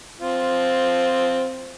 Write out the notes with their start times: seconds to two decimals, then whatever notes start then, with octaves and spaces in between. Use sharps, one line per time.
0.20 C4 F4